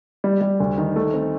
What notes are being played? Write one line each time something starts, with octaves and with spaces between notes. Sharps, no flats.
G3
G3
D2
D#3
A3
C4